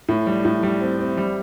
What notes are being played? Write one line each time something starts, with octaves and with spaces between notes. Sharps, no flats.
A2
G3
A2
G3
C4
C4
G3